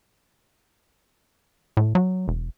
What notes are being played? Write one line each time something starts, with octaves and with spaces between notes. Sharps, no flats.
A2
F#3
E1